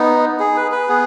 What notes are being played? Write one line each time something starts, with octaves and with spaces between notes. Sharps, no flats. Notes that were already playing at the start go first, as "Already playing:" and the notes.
Already playing: B3 D#4
G#4
B4
B4
B3 G#4